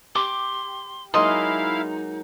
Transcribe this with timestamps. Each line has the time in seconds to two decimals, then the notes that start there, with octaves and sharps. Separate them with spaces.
0.15 G4 C6 D6
1.14 F#3 G#3 A#3 D#4 E4 D#5 F5 C6